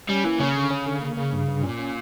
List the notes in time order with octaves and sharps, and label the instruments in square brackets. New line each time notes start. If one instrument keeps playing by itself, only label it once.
[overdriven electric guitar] G3 [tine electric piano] C#4
[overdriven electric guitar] E3 [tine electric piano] A#3
[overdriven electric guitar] C#3 [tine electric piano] C#4
[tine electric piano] D3
C#4
D3
A#3
A#3
G2
G2
[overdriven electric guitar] A#2 [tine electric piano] C#4
[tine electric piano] C#4